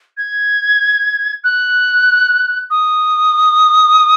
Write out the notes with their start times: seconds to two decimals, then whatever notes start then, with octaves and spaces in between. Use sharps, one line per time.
0.17 G#6
1.44 F#6
2.70 D#6